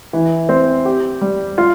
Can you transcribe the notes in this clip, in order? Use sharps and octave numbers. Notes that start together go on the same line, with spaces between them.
E3
C4
G4
G3
F4